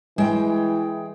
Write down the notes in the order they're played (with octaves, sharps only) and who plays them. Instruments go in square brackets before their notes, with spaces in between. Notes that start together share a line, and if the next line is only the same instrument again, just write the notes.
[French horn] E3 [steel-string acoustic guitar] G#3 G5